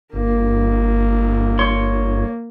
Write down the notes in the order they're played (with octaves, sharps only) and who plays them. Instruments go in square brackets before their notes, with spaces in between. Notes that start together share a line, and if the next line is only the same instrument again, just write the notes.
[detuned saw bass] G1 [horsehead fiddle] A#3
[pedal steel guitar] C#5 C6